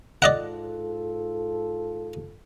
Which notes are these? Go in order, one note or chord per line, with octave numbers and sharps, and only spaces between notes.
G#2 F4 A4 D5 D#5 F#5